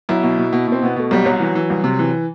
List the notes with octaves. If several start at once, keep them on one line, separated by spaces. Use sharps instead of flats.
B1 E4
B2
B2
B2
B2 C4
B2 B3
B2 A3
B1 G3
C2 F#3
E3
E3
C2
C3
E3